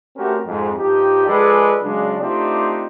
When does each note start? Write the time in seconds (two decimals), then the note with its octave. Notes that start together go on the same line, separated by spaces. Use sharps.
0.16 A3 C4 C#4 F#4 G4 A#4
0.47 F2 G#2
0.77 G2 F3 D#4 G4
1.27 F3 G#3 G#4 A4 B4 D5
1.82 C#3 F#3 G#3 D4
2.20 A3 C4 D4 D#4 F4 G4